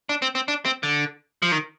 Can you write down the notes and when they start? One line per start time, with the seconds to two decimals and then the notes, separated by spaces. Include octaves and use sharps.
0.09 D4
0.22 C4
0.35 C4
0.48 D4
0.65 C4
0.83 D3
1.42 F3
1.52 D#3